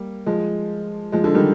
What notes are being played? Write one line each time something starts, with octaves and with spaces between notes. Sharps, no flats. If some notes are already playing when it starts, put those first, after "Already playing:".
Already playing: G3 A#3
F3 G#3
F3 G#3
D3 F3
D#3 G3